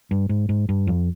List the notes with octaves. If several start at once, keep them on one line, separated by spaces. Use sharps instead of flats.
G2
G#2
G#2
G2
F2